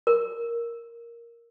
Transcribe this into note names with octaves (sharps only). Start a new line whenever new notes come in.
A#4